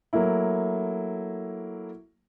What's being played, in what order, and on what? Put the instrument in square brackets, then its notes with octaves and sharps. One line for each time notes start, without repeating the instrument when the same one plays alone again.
[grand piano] F#3 A3 A#3 E4